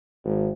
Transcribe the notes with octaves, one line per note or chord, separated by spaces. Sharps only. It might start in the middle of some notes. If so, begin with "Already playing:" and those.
G#1